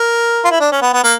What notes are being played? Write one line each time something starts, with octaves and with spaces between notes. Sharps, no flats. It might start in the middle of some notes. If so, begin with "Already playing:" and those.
Already playing: A#4
F4
E4
D4
C#4
B3
B3
A#3